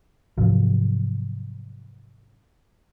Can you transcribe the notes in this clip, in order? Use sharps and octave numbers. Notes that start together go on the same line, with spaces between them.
G#2 C3 F3 F#3